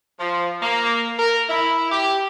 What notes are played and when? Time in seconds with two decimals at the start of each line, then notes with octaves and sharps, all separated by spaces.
0.20 F3
0.62 A#3
1.19 A#4
1.50 E4
1.91 G4